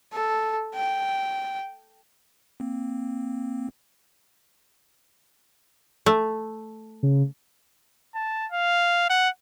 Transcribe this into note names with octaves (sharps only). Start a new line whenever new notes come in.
A4
G5
A#3 C4
A3
C#3
A5
F5
F#5